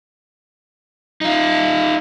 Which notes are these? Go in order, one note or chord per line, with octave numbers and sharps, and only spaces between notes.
D#4 F4